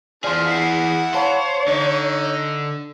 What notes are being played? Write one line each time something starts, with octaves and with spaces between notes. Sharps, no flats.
E3 F3 D4 G#4 D5 C6 F6
E4 F#5 B6 C7
C5 C#5 F5 A5 B5
D3 D#4